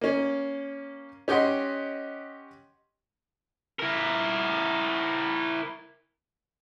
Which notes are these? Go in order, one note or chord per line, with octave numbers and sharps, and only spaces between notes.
A#3 C#4
C#4 G4 D#5 F#5 C6
E4 A#4